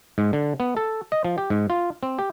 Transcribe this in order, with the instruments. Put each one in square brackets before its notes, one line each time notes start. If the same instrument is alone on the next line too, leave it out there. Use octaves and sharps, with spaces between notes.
[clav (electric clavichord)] G#2
D3
B3
A4
D#5
F3
G4
G#2
F4
C4
G4